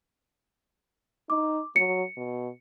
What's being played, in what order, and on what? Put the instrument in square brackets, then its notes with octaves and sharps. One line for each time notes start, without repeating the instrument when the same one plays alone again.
[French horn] D#4 [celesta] D6
[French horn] F#3 [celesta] C#7
[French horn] B2